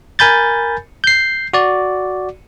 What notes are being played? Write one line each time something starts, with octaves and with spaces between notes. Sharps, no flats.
A#4 G#5 B5 G6 A6
G6 C7
F#4 D5